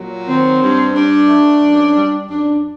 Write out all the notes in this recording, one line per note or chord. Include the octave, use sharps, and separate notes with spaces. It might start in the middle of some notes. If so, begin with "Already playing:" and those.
Already playing: A#2 F#3
D#3 C4
G2
G2 D4
A3
F#2
G3
F#2 D4